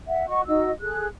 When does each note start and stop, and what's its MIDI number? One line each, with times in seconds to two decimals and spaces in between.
0.07 0.24 76
0.07 0.24 78
0.27 0.41 66
0.27 0.41 75
0.27 0.41 78
0.27 0.41 85
0.47 0.70 63
0.47 0.70 66
0.47 0.70 75
0.47 0.70 88
0.80 1.07 68
0.80 1.07 69
0.80 1.07 90